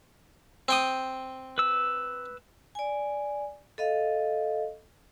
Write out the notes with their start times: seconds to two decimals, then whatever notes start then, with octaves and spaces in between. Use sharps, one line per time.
0.68 C4 G5 D#6
1.58 B4 E6
2.75 D5 G#5
3.78 A4 D#5 F5